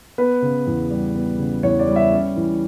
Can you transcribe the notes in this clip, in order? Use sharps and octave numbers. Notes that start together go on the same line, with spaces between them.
B3 B4
C#3
E2
G3
B3
C#3
E2 C#5
D5
G3
E5
C#4
E3